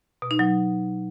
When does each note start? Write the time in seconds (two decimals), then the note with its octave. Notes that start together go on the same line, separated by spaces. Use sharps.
0.22 B2
0.31 D#4
0.39 F#3